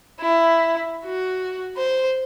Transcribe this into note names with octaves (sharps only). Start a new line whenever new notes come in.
E4
F#4
C5